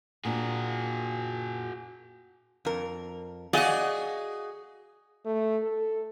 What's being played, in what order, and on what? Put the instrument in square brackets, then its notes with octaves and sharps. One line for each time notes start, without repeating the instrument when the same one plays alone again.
[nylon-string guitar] A#2 D4 [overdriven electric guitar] F#4 G#4
[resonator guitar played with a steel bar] F2 A#4
[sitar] F#4 G#4 D#5 [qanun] D5 F#5 [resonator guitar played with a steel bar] F5
[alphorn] A3
A4